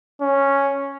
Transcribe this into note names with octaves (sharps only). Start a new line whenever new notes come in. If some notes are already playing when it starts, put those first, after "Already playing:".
C#4